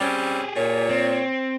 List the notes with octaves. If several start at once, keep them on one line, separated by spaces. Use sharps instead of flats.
G3 C4 C#4 G4 G#4
A#2 C#5
C4